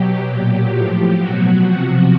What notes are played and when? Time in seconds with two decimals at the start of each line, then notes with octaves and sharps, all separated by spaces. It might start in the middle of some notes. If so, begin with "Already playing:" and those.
Already playing: B2 F#3 G4
0.28 A#2 F#3 G4
0.74 A2 F3
1.20 B2 F#3 F#4
1.66 C3 F3